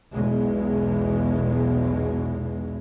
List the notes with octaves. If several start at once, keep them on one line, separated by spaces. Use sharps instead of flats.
B1 E2 B2 G#3